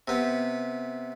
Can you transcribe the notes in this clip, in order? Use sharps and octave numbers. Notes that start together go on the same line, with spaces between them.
C3 B3